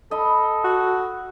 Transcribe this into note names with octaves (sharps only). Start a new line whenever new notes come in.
A4 D#5 B5
F#4